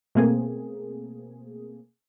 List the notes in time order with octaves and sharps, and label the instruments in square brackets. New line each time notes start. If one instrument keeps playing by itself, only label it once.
[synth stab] B2 A3 A#3 C4 G#4